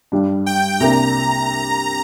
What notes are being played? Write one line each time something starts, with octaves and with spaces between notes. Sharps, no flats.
G2 G3 D4
G5
C2 C3 A#3 D4 A#5